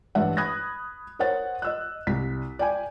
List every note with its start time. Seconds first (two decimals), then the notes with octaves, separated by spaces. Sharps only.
0.15 A1 G2 D4 E5 F#5
0.37 B5 D#6 F#6 G#6 A#6
1.19 A#4 C5 C#5 F#5 A6
1.62 D#5 E6 F#6
2.07 C2 B6
2.59 D5 G5 G#5